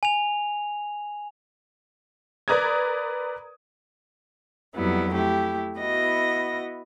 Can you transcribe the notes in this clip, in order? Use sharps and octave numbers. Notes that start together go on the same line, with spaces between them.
G#5 F7
A#4 B4 D5 A#5 D#6 G#6
F2 F#3 G3 B3 E4
A3 E4 G4
B3 E4 F#4 D#5 A#6